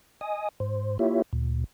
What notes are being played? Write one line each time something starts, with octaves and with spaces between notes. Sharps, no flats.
D#5 G#5 D#6
G#2 C5
A#3 E4 F4 G4 C#5 E5
D2 A#2